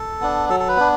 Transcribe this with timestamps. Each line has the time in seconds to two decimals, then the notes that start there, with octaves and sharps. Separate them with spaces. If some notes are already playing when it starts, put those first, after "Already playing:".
Already playing: A4
0.21 B3 D4
0.49 F#3 A4
0.60 A4
0.68 B4
0.77 B3 D4